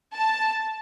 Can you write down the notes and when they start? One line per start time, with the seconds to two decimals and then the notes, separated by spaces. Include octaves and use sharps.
0.13 A5